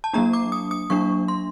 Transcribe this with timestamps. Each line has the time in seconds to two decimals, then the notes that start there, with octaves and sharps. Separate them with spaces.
0.04 A5
0.13 F#3 A#3 D4 A#5
0.33 D6
0.52 D#6
0.71 D#6
0.90 F#3 A#3 D4 C#6
1.28 C6